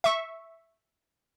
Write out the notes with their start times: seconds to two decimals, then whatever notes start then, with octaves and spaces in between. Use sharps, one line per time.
0.04 E5 C#6